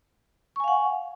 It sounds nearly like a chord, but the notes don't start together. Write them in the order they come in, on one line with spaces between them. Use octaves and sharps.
C#6 G#5 F5 F#5